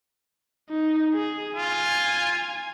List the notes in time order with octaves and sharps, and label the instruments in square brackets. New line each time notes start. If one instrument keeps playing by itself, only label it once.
[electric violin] D#4
G#4
[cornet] F4 [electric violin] G#5